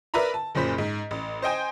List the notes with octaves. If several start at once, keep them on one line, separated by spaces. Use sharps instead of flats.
A#4 B4 D5 E5 A#5 B5
A5
F#1 F#2 A#2 C5 B5 B6
G#2
A1
C5 D#5 G5 G#5